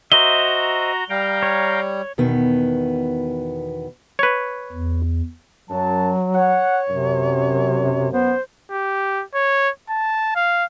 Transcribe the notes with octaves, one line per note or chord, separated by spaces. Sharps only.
F#4 C5 D#5 E5 A#5 G7
G3 F5 G5 A#5
C#5
E2 B2 D#3 B3
B4 C#5
E2
F#2 F#3 A5
C#5 F#5
F#2 C3
B3 C5
G4
C#5
A5
F5